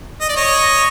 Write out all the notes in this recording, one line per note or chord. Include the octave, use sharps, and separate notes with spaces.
D#5
D5
C#5 D#5